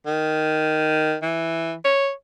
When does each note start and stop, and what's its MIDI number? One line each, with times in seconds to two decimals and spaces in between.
0.06 1.15 51
1.22 1.74 52
1.84 2.11 73